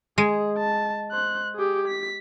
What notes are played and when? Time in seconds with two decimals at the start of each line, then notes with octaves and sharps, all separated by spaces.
0.18 G#3 G#4
0.58 A5
1.12 C5 F#6
1.55 G4 G#4
1.88 B6